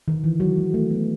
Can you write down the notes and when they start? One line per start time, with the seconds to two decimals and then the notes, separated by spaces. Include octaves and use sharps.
0.08 D#3
0.24 E3
0.40 F#3
0.58 G#3
0.74 A3
0.90 B3